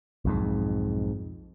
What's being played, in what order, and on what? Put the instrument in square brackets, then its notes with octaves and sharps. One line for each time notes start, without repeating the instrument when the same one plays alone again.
[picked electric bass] B1 F2 G#2